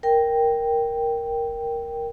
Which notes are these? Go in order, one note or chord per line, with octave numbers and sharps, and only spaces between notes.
A#4 G5